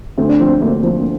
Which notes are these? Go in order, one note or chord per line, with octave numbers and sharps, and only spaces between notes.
D2 C4
D4
F3 C4
D2 A#3
F3